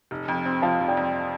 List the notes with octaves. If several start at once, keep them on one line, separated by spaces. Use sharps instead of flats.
F1
F2
C4
F3 F5 A5
F1
D5 G5
F2